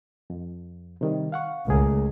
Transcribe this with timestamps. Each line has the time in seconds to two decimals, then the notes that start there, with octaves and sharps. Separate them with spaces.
0.30 F2
1.01 C3 D#3 G3
1.32 F5 F#5 C#6
1.68 C#2 A3 G#4 A#4